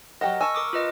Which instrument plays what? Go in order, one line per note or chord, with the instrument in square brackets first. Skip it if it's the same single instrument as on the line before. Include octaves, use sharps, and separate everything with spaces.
[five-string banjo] F#3 G4 F#5 [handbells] A#4 D#5
[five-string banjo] G#5 A5 [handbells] C#6 E6
[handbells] A#4 D6 D#6
F4 B4 D#5